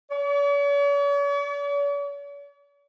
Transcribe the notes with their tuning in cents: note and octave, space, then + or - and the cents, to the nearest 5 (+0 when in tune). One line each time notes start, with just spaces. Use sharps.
C#5 +45